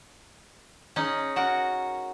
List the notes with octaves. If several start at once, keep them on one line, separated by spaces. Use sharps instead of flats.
C#4 D#4 G#4
F#4 A#4 F#5